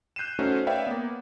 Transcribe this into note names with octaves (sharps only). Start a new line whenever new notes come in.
F#6 G6 C7 D#7 E7
A3 C#4 D#4 F#4 C5
B4 C#5 D5 E5 F5 G5
A#3 B3